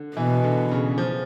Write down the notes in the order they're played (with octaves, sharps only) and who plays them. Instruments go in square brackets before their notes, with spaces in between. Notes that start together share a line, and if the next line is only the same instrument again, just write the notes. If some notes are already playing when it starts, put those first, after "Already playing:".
Already playing: [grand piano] D3
[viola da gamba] B2 [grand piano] E3
[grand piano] D3
C#3
F3